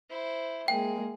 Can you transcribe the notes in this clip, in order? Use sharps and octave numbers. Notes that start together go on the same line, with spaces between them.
E4 C5
G#3 A#3 G#4 G5